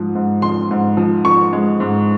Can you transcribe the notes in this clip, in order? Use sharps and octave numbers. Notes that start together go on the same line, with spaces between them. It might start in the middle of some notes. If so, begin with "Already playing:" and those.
Already playing: G#2 F3
G#2
F3 C6
G#2
F3
F3 C#6
G#3
G#2